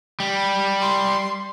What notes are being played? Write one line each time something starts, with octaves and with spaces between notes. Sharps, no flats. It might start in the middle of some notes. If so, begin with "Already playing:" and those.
G3
C6